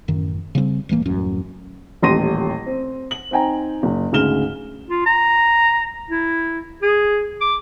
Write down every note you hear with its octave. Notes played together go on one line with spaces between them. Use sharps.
A1 F#2 D#3
C#3 G3 B3 C4
D#1 G#1 E3 A#3
D#1 A1 F#2 C#4
D#1 A1 C6 A#6 D#7
C4
F#7
C4 D#4 G5 G#5 A#5
F#1
D2 G#2 C#3 F6 E7 G7
F4
A#5
E4
G#4
D6